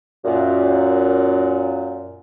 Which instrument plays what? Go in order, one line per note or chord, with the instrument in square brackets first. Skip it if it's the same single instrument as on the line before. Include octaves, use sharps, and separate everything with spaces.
[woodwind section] F#2 A#2